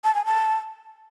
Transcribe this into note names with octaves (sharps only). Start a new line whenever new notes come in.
A5
G#5
A5